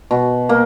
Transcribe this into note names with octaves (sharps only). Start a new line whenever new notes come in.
B2
A#3